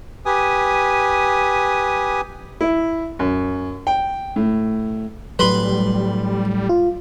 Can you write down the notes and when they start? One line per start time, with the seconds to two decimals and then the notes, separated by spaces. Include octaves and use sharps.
0.26 G4 B4 G#5 D#6
2.61 E4
3.19 F#2
3.87 G5
4.36 A2
5.39 A2 F#3 G3 B4 B5 C6
6.69 F4